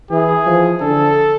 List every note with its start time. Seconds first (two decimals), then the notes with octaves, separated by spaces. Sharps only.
0.11 E3 G#4
0.46 F3
0.80 D3 A4